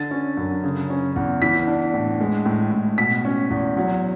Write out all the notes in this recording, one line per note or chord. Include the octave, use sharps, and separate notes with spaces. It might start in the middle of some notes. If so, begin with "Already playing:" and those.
Already playing: D3 A6
C#4
F#2
C#3
C#4
E2
E3 B6
D4
A2
G#3
A2
A2
B2 B6
C#4
E2
F#3